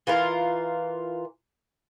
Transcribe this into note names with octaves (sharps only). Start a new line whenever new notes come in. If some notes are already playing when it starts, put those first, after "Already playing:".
E3 F4 A#4